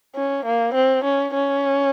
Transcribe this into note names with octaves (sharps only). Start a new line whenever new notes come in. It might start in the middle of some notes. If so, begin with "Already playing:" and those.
C#4
A#3
C4
C#4
C#4